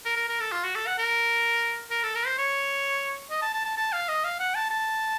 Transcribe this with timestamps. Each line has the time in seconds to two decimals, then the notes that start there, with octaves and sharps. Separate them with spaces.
0.05 A#4
0.16 A#4
0.29 A#4
0.40 A4
0.52 F4
0.64 F#4
0.75 A4
0.87 F#5
0.98 A#4
1.91 A#4
2.03 A4
2.15 A#4
2.26 C5
2.38 C#5
3.31 D#5
3.42 A5
3.54 A5
3.65 A5
3.77 A5
3.93 F5
4.08 D#5
4.24 F5
4.40 F#5
4.55 A5
4.70 A5